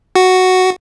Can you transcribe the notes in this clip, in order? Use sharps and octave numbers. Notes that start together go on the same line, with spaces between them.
F#4